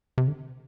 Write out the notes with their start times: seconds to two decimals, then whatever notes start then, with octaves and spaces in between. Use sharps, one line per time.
0.18 C3
0.28 D3